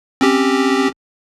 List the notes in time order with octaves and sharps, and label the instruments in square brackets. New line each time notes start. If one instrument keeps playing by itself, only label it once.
[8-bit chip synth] C4 C#4 G4